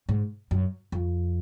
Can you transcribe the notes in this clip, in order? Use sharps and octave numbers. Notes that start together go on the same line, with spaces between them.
G#2
F#2
F2